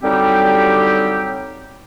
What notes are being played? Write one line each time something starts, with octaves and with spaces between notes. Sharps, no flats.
D3 F#3 G3 C4 D#4 G4